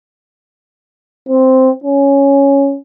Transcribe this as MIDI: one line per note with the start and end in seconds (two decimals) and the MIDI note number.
1.29 1.70 60
1.84 2.76 61